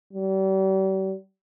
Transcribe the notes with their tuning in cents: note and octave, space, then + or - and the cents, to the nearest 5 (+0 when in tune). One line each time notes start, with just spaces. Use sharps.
G3 -40